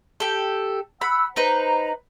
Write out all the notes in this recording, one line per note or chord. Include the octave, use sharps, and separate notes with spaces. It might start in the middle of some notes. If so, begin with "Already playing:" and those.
G4 A4
F#5 B5 E6
D#4 B4 C5 A#5